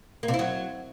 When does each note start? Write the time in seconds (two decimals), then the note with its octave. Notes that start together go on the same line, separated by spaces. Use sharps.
0.23 A#3
0.28 C3
0.34 E4
0.39 F#3